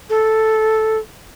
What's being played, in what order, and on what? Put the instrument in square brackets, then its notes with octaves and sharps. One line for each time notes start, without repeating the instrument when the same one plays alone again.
[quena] A4